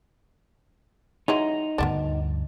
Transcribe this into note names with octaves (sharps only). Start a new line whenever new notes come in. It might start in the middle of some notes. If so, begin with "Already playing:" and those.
E3 F#3 G#3 D#4
D2 G2 D#3 B3 D4